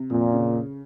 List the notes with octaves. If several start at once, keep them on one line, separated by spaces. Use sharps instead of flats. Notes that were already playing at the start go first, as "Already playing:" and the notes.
Already playing: C3
F2 A#2
C#3